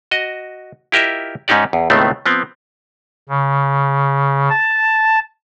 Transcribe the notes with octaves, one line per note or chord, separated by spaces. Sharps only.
F#4 D#5
E4 F4 G4 A#4 D#5 E5
G#2 C#4 D#4 G4 D5
E2
C#2 A2 D#3 A3 B3 C4
F3 B3 C4
C#3
A5